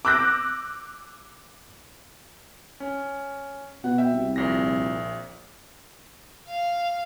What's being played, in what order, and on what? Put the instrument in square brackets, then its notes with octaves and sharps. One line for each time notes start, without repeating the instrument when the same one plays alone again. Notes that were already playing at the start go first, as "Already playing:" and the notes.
[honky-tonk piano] D6 E6 F#6 G6 A#6
[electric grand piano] C#4
[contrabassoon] B2 [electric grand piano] F#5
[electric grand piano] E5 G5
[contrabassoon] C2
[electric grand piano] A#1 A#2 A#6
[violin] F5